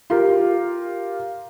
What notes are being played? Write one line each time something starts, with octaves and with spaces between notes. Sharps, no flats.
F4 G4 A#4